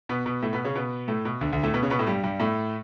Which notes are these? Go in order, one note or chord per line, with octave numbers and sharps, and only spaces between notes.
B2 B3
B2 B3
A2 A3
B2 B3
C#3 C#4
B2 B3
A2 A3
B2
D2 D3
D2 D3
A2 A3
B2 B3
C#3 C#4
B2 B3
A2 A3
G2 G3
G2 G3
A2 A3